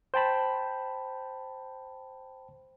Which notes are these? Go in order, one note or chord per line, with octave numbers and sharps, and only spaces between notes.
C5 G5 A5 B5